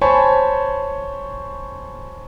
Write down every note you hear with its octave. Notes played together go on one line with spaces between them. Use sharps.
C5 C#5 G#5 A5 B5 C#6